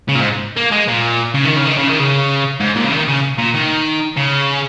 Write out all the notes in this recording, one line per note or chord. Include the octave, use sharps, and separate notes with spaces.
C#3
A#2
G#2
A#3
G#3
A#2
C#3
D#3
C#3
D#3
C#3
D#3
C#3
G#2
A#2
C#3
D#3
C#3
A#2
D#3
C#3